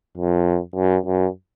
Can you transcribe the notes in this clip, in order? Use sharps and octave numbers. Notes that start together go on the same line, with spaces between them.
F2
F#2
F#2